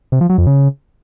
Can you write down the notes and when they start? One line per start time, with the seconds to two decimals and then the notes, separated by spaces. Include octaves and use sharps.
0.12 C3
0.21 F3
0.29 F#3
0.38 F2
0.47 C#3